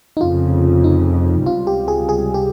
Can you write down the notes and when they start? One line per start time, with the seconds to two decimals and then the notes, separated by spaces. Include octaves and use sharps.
0.17 D#4
0.21 F1 F2 C#3 F4
0.84 D#4
1.46 C#2 C3 G3 F4
1.67 G4
1.88 G#4
2.09 G#4
2.34 G4